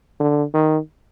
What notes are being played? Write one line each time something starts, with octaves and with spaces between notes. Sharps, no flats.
D3
D#3